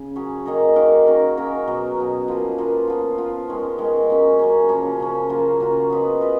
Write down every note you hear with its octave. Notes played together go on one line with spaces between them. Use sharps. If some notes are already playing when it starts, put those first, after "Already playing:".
Already playing: C#3
F#3 C#4 G#4
D#3 A#3 D#4 A#4
D#3 A#3 D#4 A#4
A#3 C#4 F#4 A#4
A#3 C#4 F#4 A#4
B2 F#3 B3
B2 F#3 B3
F3 A#3 F4 B4
F3 A#3 F4 B4
F3 B3 F4
F3 B3 F4
D#3 G#3 C#4
D#3 G#3 C#4
F#3 A#3 C#4
F#3 A#3 C#4
C#3 F3 A#3 C#4
C#3 F3 A#3 C#4
C#3 F#3 A#3 F4
C#3 F#3 A#3 F4
B3 F4 B4 D#5
B3 F4 B4 D#5